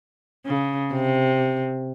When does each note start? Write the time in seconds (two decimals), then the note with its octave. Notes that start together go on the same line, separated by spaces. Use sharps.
0.46 C#3
0.93 C3